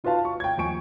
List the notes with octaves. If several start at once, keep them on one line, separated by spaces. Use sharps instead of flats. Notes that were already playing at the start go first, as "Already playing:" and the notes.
D#4 F4 F#4 B4 F5 A5
C#6
G5 G#6
D#2 F3 G#5 C#6 D7